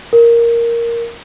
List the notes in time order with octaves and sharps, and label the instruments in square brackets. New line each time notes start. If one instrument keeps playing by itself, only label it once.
[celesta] A#4